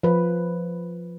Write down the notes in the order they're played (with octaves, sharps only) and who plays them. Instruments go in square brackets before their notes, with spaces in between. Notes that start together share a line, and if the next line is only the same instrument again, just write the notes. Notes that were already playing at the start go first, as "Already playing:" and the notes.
[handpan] F3 B4